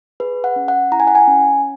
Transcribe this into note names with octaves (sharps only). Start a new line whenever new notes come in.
G#4 B4
F#5
C#4
F#5
E4 A#5
G#5
F#5
G#5
C#4